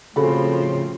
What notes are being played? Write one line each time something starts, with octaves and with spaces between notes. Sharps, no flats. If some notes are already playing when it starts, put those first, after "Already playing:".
A2 C#3 F3 C4 F#4 A4 B5